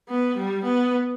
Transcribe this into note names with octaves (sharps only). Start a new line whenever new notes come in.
B3
G3
B3